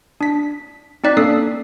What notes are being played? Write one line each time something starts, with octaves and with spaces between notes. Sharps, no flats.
D4 B6
C4 D#4 D5 F#6 B6
A#3 C#4 D4 A4 D#6 C7